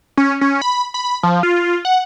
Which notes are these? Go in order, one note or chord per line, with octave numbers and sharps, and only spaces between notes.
C#4
C#4
B5
B5
F3
F4
F#5